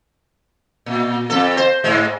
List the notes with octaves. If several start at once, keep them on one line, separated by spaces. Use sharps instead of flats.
A#2
F2 A4
C5
G#2 G#3